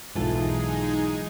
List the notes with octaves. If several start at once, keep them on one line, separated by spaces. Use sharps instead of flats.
B1 G#2 E3 G#3 D#4 F4 G#4 A4